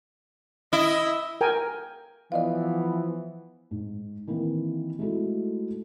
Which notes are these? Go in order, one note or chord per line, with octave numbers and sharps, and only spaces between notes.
E4 D#5
A#4 G5 G#5
E3 F3 B3 D5 D#5 F5
G#2
D#3 E3 A#3 C4 D#4
G#3 A3 D#4 E4 F#4 A4